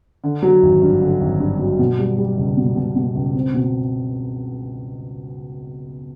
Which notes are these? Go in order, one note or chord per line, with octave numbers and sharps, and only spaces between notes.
D3
F#3
G#1
G2
D3
G#1
G2
F#3
B2
G3
G3
C#2
B2
B2
B2
C#2
C4
B2